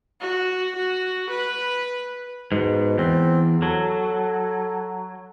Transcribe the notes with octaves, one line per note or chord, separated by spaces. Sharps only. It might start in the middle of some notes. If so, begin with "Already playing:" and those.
F#4
F#4
B4
G#2 B2
E2 C4
F#3 A4